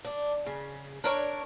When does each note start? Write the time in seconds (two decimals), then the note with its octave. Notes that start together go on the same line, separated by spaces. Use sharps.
0.05 D4
0.46 C#3
1.04 D4 A#4 C#5